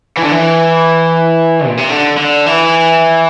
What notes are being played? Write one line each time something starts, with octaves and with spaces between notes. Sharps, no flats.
E3
D3
E3
A#2
C3
D3
D3
E3